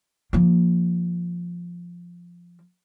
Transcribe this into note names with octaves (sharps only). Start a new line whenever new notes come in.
F3 A#3